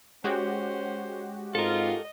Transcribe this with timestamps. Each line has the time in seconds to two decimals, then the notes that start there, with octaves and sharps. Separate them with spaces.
0.24 G#3 C#4 F#4 G4 C5
1.55 G#2 C4 F4 A4 A#4 D#5